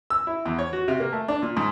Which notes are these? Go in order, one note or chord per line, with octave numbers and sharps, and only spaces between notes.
E6
E4
E2
C#5
F#4
C3
A#3
A3
D4
A#2
G#2